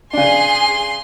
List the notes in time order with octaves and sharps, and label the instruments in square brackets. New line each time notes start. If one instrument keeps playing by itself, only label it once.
[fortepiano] C#3 D4 [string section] G#4 G#5 [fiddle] C6